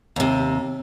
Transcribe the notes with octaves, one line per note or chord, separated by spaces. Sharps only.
D#2 C3